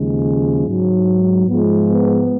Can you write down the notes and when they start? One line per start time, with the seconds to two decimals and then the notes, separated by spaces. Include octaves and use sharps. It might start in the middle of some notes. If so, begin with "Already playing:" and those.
Already playing: D#2 C#3 F3 G#3
0.67 G#2 F#3
1.48 G#2 F3 G#3 B3
1.88 B3